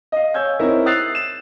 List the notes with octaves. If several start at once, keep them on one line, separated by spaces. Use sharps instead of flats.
D#5 F5
C#5 G#5 E6 G6 G#6
C4 D#4 E4 A#4 C#5 E5
D#6 E6 F#6 A6 C7 F7
E7